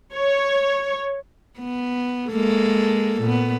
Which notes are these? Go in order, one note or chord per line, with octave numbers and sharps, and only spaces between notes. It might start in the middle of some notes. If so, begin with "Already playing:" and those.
C#5
B3
G#3 A#3 A4
A#2 B3